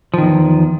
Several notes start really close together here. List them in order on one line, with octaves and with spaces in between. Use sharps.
F3 D#3 E2